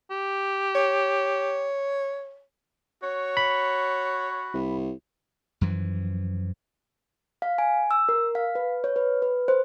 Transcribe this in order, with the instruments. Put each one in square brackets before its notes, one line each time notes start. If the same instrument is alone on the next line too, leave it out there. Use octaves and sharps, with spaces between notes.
[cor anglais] G4
[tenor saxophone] C#5
[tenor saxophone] F#4 [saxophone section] C#5
[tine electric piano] B5
[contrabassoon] C2
[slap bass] F#2 E3 F3
[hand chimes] F5
G#5
E6
A#4
F5
B4
C#5
B4
B4
C5